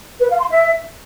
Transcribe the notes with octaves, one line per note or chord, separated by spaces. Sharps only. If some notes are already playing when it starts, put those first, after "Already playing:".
B4
F5
C6
E5